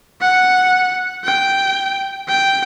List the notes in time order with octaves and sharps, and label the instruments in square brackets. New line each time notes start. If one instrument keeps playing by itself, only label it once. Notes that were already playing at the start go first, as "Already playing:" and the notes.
[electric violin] F#5
G5
G5